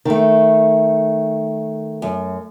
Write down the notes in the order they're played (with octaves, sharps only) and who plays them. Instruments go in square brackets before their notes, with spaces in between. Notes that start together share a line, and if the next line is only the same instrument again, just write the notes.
[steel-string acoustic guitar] D#3 A3
F#2